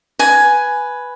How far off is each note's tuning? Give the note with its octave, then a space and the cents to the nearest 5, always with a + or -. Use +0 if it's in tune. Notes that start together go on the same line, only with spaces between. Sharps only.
B4 +0 G#5 +5